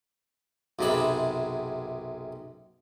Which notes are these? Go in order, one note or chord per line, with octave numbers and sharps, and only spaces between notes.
B1 F#2 C3 G#3 A5 B5